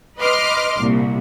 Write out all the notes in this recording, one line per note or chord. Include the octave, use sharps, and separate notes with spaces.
B4 D#5 C6 D6 F6
C2 A#2